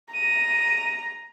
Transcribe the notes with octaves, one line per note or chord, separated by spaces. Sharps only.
A#5 D#7